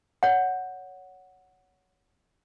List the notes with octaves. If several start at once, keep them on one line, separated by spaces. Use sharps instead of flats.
C#5 F#5